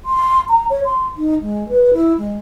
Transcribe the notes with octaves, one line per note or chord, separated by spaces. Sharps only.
C6
A#5
C#5
C6
D#4
G#3
B4
E4
G#3